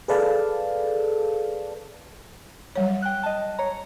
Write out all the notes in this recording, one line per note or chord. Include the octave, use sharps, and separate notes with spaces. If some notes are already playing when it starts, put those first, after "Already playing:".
G#4 A4 B4 D5 F5 A5
F#3 G3 C#5
G5 F#6
D#5 A5
C#5 A#5